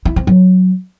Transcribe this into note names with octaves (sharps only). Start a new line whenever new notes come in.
E4
C4
F#3